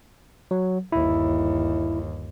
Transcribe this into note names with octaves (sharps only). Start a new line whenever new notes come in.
F#3
G1 D#2 E4